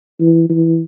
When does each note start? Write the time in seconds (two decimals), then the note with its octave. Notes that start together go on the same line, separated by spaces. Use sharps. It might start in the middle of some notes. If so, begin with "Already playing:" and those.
0.20 E3
0.50 E3